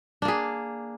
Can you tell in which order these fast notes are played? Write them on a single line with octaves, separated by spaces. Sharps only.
D4 A#3 G#4